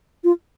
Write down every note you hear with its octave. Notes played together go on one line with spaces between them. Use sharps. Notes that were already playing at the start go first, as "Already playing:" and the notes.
F4